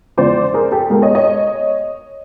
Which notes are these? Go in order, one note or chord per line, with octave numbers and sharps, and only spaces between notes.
E2 C#3 F3 G#3 B3 C5 D5
G#4 A#4
G4 A4
C#2 B2 G#3 B3 G#4 A#4
C#5 D#5
C#5 D#5